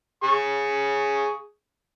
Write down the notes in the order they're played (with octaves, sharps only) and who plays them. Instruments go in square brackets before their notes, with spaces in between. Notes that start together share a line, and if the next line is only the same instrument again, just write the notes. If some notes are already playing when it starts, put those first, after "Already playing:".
[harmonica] G#4 C#6